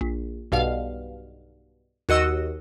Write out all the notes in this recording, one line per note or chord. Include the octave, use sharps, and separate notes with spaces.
A#1
B1 G2 B2 F5
D#2 F#4 D#5 E6